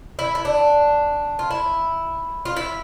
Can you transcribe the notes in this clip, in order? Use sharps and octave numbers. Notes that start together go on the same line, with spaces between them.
E4
E4
D4
F4
E4
F4
E4